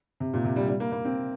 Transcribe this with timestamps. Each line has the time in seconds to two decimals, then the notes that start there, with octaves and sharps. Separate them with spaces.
0.20 C3
0.33 A#2
0.45 C3
0.56 G3
0.68 G3
0.80 A#3
0.92 A#3
1.05 C4